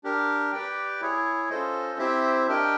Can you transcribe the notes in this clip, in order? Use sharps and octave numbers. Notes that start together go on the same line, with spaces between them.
D4 G4 A#4
G4 B4 D5 G5
E4 G#4 C#5
C#4 F4 A4 C5 D#5
C4 E4 G4 C5 E5
D4 G4 A#4 D#5 G5